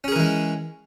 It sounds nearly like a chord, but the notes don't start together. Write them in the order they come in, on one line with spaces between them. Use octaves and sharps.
C#4 G#4 A#4 E3 G#3